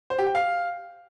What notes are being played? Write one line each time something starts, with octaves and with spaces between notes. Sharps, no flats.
C5
G4
G5
F5